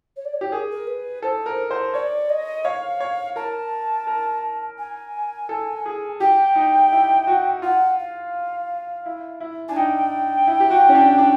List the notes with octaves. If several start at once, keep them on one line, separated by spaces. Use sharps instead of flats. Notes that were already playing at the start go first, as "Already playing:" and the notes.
C#5
D5
C#5
G4
G#4 A#4
A#4
B4
A4 C5
A#4
C5
C#5 D5
D#5
C#5 F5
C#5
A#4 A5
A#4
G#5
A4
G#4
G4 G5
D#4
E4
F#4
F4 F#5
F5
E4
E4
D4 G#5
D#4 G5
E4
G4
F#4
C#4
D4
D4